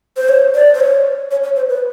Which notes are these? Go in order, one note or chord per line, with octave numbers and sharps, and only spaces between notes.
C5
C#5
D5
C5
C#5
C#5
C#5
C5
B4